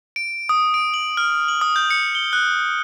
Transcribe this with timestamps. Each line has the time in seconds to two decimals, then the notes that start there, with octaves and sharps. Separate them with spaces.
0.16 D7
0.49 D#6
0.74 D7
0.94 F#7
1.17 F6
1.48 F#7
1.61 D#6
1.76 G6
1.90 C#7
2.15 G7
2.33 F#6